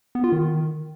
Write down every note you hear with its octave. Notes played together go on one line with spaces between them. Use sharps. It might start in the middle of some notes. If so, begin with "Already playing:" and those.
B3
F4
D#3